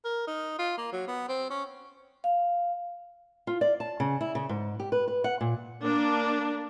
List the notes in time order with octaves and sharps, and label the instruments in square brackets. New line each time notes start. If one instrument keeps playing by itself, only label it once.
[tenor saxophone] A#4
D#4
F4
A#3
F#3
B3
C4
C#4
[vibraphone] F5
[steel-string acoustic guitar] F4
D5
A5
C#3
E4
C#3
G#2
G4
B4
B4
F#5
A#2
[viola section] A#3 D4